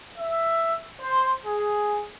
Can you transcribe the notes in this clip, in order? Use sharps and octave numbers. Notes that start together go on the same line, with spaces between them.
E5
C5
G#4